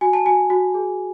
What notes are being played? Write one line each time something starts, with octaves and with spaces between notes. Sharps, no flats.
F#4 G#5
A5
F#4 G#5
F#4
G#4